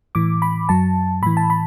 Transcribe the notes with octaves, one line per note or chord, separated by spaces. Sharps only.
A2 E3 D6
B5
F#2 F#3 A5
A2 E3 B5
A5
B5